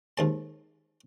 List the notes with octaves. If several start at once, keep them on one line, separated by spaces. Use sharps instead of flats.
D#2 G#2 A5